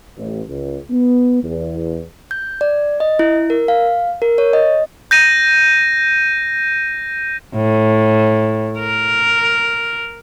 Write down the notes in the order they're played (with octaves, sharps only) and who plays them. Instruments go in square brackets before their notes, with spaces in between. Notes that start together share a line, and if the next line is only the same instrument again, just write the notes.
[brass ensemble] A1
C#2
B3
E2
[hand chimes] G6
D5
D#5
E4
A#4
F5
A#4
C#5
D#5
[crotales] G6 A#6 D#7
[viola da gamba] A2
A#4